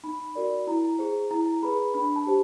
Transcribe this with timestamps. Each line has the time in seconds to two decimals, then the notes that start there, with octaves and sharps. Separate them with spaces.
0.04 D#4 B5
0.35 F#4 A#4 D5
0.67 E4 A#5
0.99 G#4 C5
1.31 E4 A#5
1.63 G#4 B4 B5
1.94 D4 B5
2.16 A5
2.27 G4 C5